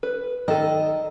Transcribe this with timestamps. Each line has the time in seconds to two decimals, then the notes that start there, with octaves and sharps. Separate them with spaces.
0.03 B4
0.48 D#3 A4 D#5